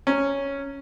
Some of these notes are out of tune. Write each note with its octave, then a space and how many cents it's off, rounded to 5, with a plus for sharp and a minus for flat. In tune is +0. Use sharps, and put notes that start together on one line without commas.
C#4 +0 A#5 -20